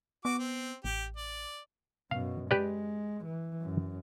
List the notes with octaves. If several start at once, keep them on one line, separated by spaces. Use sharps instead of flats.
B3 F#4 D6
C4
A1 G4
D5
F#2 B2 F5
G#3 G4 B4 D5
E3
F#2